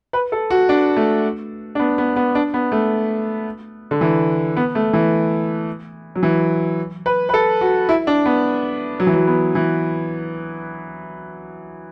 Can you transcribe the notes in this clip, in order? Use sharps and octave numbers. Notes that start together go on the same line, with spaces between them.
B4
A4
F#4
D4
A3
D4
B3
B3
B3
D4
B3
A3
D3
E3
B3
A3
E3
F#3
E3
B4
B4
A4
F#4
E4
D4
B3
F#3
E3
F#3
B3
E3